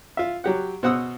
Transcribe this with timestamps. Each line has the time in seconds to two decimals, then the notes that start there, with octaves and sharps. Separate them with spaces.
0.17 F4 E5
0.44 F#3 G4 F#5
0.83 B2 C5 F#5 D#6 E6